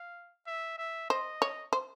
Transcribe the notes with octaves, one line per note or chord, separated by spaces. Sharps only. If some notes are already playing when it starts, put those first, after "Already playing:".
Already playing: F5
E5
E5
C5 D#5
C#5
C5